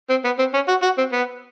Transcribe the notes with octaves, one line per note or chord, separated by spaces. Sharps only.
C4
B3
C4
C#4
F#4
F#4
C4
B3